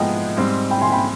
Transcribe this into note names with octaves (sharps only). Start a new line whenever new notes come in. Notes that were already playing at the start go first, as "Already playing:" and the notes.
Already playing: G#2 F3 G#3 B3 D#5 G5
G#2 G3 C4
G5 B5
G#5 C6
G5 B5